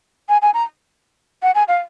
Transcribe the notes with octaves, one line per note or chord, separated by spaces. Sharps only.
G#5
G#5
A#5
F#5
G#5
F5